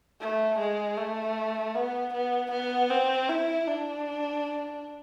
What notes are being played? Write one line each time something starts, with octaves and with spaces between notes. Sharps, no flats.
A3
G#3
A3
B3
B3
B3
C4
E4
D4